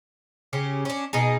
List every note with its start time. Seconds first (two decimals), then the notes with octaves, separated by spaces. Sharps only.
0.53 C#3 C#4 G4
0.85 C#4 D4
1.13 B2 D#4 G#4